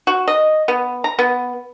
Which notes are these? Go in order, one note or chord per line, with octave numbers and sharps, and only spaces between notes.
F#4
D#5
B3
A#5
B3